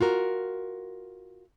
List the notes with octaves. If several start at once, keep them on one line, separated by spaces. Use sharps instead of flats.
F4 F#4 A#4